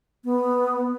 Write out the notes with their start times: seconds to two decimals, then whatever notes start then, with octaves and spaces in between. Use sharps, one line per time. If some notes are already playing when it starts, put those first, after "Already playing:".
0.25 B3